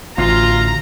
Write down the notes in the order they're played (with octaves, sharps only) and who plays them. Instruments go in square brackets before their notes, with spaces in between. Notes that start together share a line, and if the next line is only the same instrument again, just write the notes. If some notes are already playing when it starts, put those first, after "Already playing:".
[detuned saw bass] A1 [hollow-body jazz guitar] D2 [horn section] F4 [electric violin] A#5